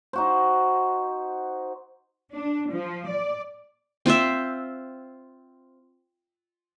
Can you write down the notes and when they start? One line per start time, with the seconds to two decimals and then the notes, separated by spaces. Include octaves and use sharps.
0.13 D#4 F#4 C5
2.34 D4
2.72 F3
3.10 D5
4.06 C4 F4 C5 E5